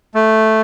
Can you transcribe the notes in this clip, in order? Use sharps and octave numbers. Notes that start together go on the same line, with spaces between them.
A3